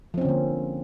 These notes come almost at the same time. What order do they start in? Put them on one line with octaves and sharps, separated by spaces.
F3 C4 C#4 D3 A#3